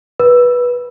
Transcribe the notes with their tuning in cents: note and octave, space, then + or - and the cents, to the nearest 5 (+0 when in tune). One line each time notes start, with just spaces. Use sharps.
B4 -15